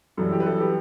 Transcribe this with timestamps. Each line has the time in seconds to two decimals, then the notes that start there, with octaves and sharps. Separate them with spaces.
0.17 F#2 E3 G3 A4
0.32 G4
0.40 B4
0.46 A4
0.60 G4